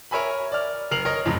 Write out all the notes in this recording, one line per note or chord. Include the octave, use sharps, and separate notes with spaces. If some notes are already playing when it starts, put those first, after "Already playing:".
A#4 C#5 E5 G#5 B5
D5 F6
F#1 A#4 F6 C7 F7 F#7
A#4 C#5 D#5
F2 A2 C#3 F#3